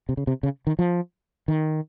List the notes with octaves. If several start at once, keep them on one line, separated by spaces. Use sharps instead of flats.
C3
C#3
C3
C#3
D#3
F3
D#3